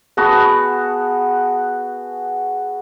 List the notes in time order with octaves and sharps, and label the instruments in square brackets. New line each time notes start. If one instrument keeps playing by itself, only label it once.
[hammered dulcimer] B3 F#4 G#4 A5